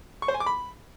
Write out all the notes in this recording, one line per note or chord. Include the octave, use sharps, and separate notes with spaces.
C#6
C5
G#5
D6
B5